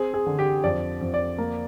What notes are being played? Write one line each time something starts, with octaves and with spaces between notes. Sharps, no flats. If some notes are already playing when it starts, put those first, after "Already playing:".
Already playing: C4 G#4
G#4
D3
G4
F2 D5
F2
D5
A#3